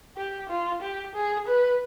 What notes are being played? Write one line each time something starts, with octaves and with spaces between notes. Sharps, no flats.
G4
F4
G4
G#4
B4